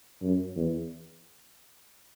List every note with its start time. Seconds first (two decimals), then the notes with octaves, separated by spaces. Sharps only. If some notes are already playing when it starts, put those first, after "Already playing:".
0.22 F#2
0.56 E2